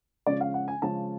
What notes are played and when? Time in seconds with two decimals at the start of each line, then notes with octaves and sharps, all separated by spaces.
0.26 C#3 F3 G#3 C#4 D5
0.41 F5
0.54 F#5
0.68 G#5
0.82 C#3 F3 G#3 C#4 A5